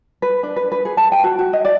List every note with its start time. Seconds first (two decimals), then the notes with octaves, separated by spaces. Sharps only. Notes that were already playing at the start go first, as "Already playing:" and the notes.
0.22 B4
0.43 D4
0.56 B4
0.72 B4
0.85 G#4
0.97 A5
1.12 G5
1.24 F#4
1.39 F#4
1.53 D#5
1.65 D5